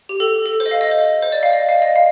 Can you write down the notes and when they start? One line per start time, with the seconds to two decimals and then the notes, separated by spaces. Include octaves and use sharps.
0.09 G4
0.20 A4
0.46 A4
0.60 C5
0.66 D#5
0.71 F5
0.81 D#5
0.91 C5
1.23 C5
1.32 D5
1.43 F5
1.53 D#5
1.69 F5
1.82 D#5
1.96 F5